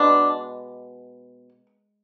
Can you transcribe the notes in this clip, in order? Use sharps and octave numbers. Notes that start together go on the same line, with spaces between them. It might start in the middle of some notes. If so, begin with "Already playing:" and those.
Already playing: B2 G#3 B3 D4